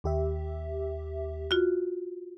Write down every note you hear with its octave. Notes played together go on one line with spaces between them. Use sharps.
D#2 G4 E5
F4 F#4